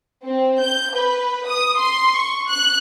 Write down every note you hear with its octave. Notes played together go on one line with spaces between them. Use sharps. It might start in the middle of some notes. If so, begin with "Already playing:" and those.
C4
G6
B4
D#6
C6
C#6
F#6